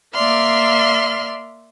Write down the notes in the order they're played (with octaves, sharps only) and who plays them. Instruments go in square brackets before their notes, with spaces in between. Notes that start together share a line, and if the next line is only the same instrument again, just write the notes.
[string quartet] A#3 D5 E5 C6 F6